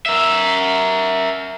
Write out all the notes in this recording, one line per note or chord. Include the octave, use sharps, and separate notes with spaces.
A#4 E5